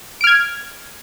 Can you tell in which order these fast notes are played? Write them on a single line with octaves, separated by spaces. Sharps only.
D7 F6 G#6